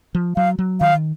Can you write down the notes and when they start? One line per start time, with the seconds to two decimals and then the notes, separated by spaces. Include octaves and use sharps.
0.15 F3
0.36 F#3 F5
0.59 F#3
0.81 D#3 F5